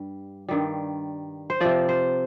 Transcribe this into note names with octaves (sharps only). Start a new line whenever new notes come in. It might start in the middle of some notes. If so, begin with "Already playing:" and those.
Already playing: G2 G3
G2 D#3 G3
C5
C3 F3 D5
C5